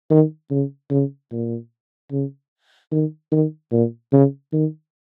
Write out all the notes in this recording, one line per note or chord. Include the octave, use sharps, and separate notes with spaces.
D#3
C#3
C#3
A#2
C#3
D#3
D#3
A#2
C#3
D#3